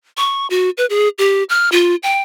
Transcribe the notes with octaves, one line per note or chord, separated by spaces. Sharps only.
C#6
F#4
B4
G#4
G4
F6
F4
G5